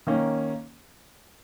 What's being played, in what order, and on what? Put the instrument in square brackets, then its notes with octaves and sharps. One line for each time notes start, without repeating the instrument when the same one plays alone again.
[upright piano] D#3 A#3 C#4